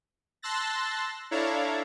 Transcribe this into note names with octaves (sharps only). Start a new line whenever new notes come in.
A5 C6 E6 F#6 A6 A#6
D4 E4 A4 C#5 F5 A#5